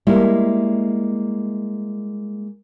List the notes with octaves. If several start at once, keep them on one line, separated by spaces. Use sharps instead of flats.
G3 G#3 A#3 E4